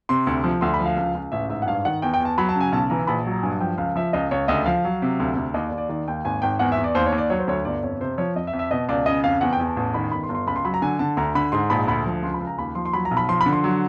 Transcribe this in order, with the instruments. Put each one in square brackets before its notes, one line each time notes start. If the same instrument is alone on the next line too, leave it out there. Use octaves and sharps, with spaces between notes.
[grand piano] C3 C6
D2
F3
D2 C6
B5
F3
F5
C#2
C#2
A1 E5
G#2 E5
F#5
G2 F5
D#3 F#5
E2 G5
G5
E2
A5
F#3 B5
A5
C#3
G#5
B1 A5
E3 A#5
A#1 B5
F#3
A#5
G2 G#5
F3 G5
C#2 F5
F3 E5
C#2 D#5
C#2 C#5
D2 D#5
F3 F5
F#3
C3
D2
D2
D#2 D#5
D5
D#2
D5
D#3 D5
D#2 G5
G#1 G#5
G#1 G5
E2 F#5
E5
E2
D5
D#2 C5
C#5
D#2
D5
F#3 C#5
C5
D2 C#5
G1 D5
F2 C#5
C3 C5
F3 C#5
F2 D#5
E5
F2
E5
B2 D#5
C#2 D5
C#3 D#5
F2 F5
E2 F#5
G5
E2
A5
A1 A5
D#3 B5
G1 B5
C6
G1
C6
C#2 B5
C6
F#3 B5
A#5
D3 G#5
D3 A5
D2 A#5
D3 B5
G#2 C6
A#1 B5
D2 B5
F3
C#2 C6
B5
C#2
A#5
D#2 B5
F3 C6
C6
F#3 B5
A#5
B1
B5
F3 C6
B5
D3
C6
F#3